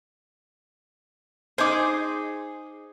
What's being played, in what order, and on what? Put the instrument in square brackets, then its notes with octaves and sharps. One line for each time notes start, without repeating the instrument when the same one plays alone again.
[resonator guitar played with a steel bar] D#4 C5 [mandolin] G#4 D6